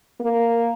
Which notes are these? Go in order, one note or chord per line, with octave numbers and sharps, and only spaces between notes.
A#3